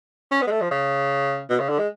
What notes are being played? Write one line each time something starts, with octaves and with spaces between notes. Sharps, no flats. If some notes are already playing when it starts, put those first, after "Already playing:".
C#4
B3
G#3
A3
F3
C#3
B2
C#3
D3
G#3